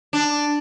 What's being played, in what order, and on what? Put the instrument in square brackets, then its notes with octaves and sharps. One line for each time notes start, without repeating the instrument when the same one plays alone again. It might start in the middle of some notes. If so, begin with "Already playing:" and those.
[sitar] D4